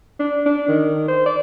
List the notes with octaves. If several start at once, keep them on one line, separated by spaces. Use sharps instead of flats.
D4
D4
D#3
C5
D5